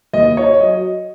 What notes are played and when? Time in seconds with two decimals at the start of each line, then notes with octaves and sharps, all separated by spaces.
0.13 D#2 D#5
0.37 C#5
0.60 F#3 D#5